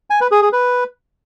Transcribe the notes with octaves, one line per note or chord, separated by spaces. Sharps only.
G#5
B4
G#4
G#4
B4